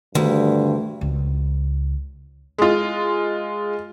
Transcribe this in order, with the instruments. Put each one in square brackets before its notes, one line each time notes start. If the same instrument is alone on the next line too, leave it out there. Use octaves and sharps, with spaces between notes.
[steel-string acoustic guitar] D2 [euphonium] G2 [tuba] D3 [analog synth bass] D#3
[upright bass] C#2
[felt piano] G#3 F4